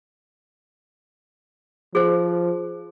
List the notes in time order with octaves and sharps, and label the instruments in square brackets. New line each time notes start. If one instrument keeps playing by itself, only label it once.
[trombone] F3 [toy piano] G#4 C5